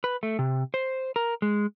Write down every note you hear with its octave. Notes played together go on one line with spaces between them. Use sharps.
B4
A3
C3
C5
A#4
G#3